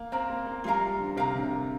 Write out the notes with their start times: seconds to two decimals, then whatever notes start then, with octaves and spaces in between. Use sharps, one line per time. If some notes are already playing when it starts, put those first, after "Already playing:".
Already playing: A#3
0.12 C4 A#4 D5 A#5
0.30 A#3
0.47 A#3
0.64 G3 F4 A#4 F5 A#5
0.99 D3
1.16 C3 A#4 F5 A#5
1.34 D3
1.43 C3